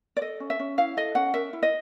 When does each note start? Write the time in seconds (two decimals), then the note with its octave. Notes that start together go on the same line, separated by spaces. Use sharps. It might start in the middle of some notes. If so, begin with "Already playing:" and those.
0.17 D5
0.21 A4 D#5
0.40 C#4
0.50 E5
0.59 C#4
0.78 E4 F5
0.97 A4 D#5
1.15 C#4 F#5
1.34 A#4 E5
1.53 E4
1.63 D#5